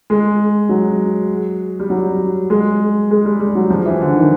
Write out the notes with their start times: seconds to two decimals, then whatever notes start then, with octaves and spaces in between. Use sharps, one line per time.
0.10 G#3
0.69 F#3
1.80 G3
1.90 F#3
2.50 G#3
3.11 G#3
3.25 G3
3.40 G3
3.55 F#3
3.70 F3
3.86 E3
4.01 D3
4.16 D#3